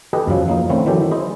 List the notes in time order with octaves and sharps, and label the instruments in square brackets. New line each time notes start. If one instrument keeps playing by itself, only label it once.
[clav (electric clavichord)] G4 A4 B4 D#5 G5 G#5
F#2 C#3 F3 F#3
F3 A#3 D#4
D3 D#3 A3 C4 C#4 E4
D#3 E3 F#3 G4 A4
E4 G#4 C5 D#5